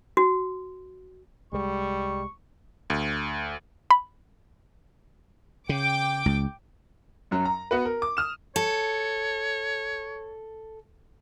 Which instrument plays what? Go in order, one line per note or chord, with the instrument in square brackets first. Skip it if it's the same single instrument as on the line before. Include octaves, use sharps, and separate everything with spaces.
[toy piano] F#4
[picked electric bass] C2 G#3 [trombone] G3 [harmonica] C#6
[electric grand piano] D2
[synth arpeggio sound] B5
[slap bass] C#3 [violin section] G5 D6
[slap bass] C#2
[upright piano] F#2 F#3
A#5
B3 F#4 B4
A#4
D6
D#6 F6 E7
[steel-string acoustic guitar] A4 [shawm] C#5